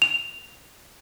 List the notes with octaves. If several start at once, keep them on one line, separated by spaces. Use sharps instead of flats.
F7